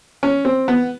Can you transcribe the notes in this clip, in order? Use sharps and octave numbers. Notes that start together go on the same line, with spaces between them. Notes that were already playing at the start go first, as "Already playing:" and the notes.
C#4
C4
B3